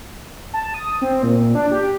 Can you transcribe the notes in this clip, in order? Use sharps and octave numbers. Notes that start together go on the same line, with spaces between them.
A5
D#6
C4
A#2
D4
G4